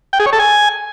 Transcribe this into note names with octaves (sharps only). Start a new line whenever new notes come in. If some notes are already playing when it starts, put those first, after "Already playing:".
G5
G#4
C#5
A4
G#5